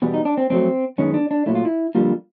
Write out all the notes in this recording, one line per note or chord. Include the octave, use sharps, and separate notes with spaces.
E2 B2 G3 B3
D#4
D4
C4
F2 D3 F#3 A3 C4
F#2 D#3 G#3 B3 C#4
D4
D4
A#2 F#3 A3 E4
F4
E4
F2 D3 G3 A#3 F4